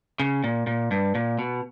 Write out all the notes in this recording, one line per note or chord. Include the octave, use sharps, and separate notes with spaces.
C#3
A#2
A#2
G2
A#2
B2